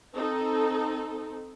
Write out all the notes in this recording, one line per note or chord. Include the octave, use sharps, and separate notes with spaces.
C4 D#4 A4